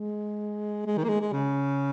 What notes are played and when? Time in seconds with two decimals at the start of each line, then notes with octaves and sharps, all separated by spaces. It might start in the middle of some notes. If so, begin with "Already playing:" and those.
Already playing: G#3
0.86 G#3
0.98 D#3
1.04 A#3
1.09 G#3
1.21 G#3
1.33 C#3